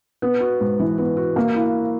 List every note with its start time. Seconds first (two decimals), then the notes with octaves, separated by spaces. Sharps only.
0.22 B3
0.41 F#4
0.60 G#2
0.79 E3
0.98 B3
1.17 F#4
1.36 A#3
1.55 E4